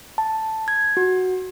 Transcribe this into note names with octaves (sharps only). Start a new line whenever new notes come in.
A5
G#6
F#4